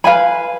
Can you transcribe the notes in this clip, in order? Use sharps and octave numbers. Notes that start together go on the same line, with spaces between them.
B4 F5 G#5 B5